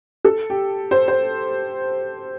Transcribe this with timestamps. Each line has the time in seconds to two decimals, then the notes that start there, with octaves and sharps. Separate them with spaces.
0.25 A4
0.50 G4
0.91 C5
1.08 C5